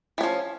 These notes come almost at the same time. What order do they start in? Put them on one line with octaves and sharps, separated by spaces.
E3 C#4 F3